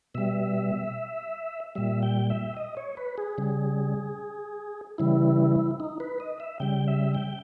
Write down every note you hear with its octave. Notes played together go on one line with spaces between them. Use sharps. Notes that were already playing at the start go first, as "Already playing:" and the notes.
B2 G3 E5
A#2 G3 E5
G5
E5
D#5
C#5
B4
G#4
C#3 G3
C#3 E3 G3 E4
D#4
B4
D#5
E5
C#3 G3 G5
E5
G5